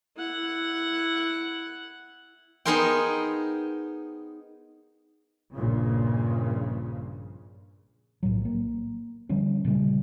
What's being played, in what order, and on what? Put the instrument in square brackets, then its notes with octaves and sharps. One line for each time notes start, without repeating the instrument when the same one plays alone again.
[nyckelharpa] E4 F#5
[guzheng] B3 D#4 G#4 A#4 C5 G5
[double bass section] A#1 G2 A#2 C#3
[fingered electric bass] B1 A2 F3 F#3
A#3
D3 F3 G3 C#4
A#2 C#3 G3 A3